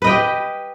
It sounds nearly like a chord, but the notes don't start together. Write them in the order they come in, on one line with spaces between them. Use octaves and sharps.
B4 D#5 G5 G4